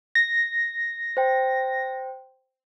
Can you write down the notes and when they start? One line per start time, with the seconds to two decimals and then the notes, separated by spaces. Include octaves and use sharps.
0.15 A#6
1.17 C5 G5